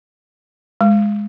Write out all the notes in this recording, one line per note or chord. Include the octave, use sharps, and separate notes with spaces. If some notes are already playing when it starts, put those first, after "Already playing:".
G#3